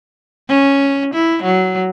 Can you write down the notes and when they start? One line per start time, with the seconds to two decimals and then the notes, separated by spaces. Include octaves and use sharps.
0.49 C#4
1.14 E4
1.44 F#3